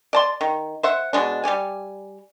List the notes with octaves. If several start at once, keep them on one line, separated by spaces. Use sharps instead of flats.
D5 A5 C6
D#3
C5 E5 F#5
B2 G#3 D4
G3 G4 D5 G#5